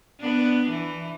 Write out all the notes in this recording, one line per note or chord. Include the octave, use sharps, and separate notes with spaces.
B3 D4
E3